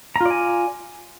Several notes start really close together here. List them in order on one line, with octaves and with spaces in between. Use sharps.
A#5 F4 D5 G#5